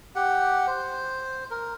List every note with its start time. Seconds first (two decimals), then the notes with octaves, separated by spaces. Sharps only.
0.15 G4 F#5
0.67 C5
1.51 A#4